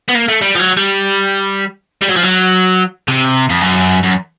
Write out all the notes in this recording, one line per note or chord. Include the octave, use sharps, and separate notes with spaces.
B3
A#3
A3
G3
F3
F#3
G3
G3
F#3
F3
F#3
C3
F2
F#2
F#2